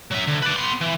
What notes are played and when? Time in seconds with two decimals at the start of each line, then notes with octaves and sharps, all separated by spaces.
0.12 F#3 E5
0.28 D2
0.43 B4 D5
0.56 B3 C6
0.81 E3